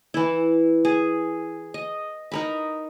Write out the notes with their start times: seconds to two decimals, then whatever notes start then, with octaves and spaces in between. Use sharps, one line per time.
0.14 E3 E4
0.85 G#4
1.74 D#5
2.32 D#4 A#4 B5